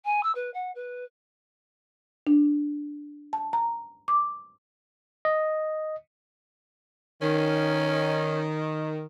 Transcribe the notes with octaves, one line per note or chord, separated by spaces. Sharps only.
G#5
E6
B4
F#5
B4
D4
A5
A#5
D6
D#5
D#3 C#4